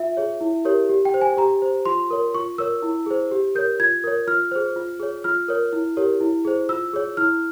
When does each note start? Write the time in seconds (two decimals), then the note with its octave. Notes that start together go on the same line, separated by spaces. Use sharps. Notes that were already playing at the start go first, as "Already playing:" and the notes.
Already playing: F4 E5
0.17 G#4 C#5
0.41 E4
0.65 G4 A#4 C#5
0.89 G4
1.05 G5
1.14 C5
1.21 G#5
1.37 G4 A#5
1.62 C5
1.85 F4 C6
2.10 A#4 C#5
2.34 F4 C#6
2.58 A#4 C#5 E6
2.82 E4
3.06 G#4 C5
3.31 G4
3.55 A#4 C#5 G6
3.80 F4 G#6
4.04 A#4 C#5
4.28 F4 F6
4.51 G#4 C5
4.76 F4
5.00 G#4 C#5
5.24 F4 F6
5.48 A#4 C#5
5.73 E4
5.97 G4 A#4 C#5
6.20 E4
6.45 G#4 C5
6.69 F4 E6
6.93 G#4 C#5
7.17 E4 F6